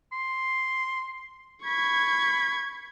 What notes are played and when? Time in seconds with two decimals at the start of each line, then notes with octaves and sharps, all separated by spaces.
0.12 C6
1.65 B5 C#6 G#6